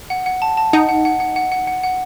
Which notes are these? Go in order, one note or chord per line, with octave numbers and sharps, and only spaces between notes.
F#5
F#5
A5
A5
D#4 F#5
F#5
F#5
F#5
F#5
F#5
F#5
F#5